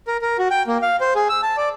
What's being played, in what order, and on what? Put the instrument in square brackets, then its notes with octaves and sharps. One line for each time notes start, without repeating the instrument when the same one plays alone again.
[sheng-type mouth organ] A#4
A#4
F#4
G5
A#3
F5
C5
G#4
E6
A5
D5